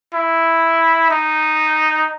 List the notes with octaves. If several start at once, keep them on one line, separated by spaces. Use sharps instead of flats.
E4
D#4